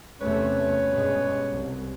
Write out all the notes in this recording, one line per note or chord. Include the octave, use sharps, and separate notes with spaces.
E2 C3 A3 C#4 B4 C#5
G2 B2 G#3
C2